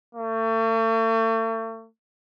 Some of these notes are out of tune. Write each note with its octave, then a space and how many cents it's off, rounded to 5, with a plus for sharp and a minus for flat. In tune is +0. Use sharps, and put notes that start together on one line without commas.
A3 +40